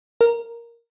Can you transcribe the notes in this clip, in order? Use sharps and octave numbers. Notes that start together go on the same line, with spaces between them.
A#4